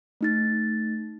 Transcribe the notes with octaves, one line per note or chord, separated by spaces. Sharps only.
A3 D#4 A6